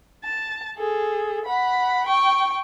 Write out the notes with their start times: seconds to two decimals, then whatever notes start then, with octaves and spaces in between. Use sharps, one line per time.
0.24 A5
0.77 G#4 A4
1.46 F#5 B5
2.07 G5 C#6